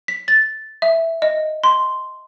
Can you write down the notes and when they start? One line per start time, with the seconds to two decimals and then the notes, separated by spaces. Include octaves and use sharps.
0.08 B6
0.28 A6
0.82 E5
1.22 D#5
1.64 C6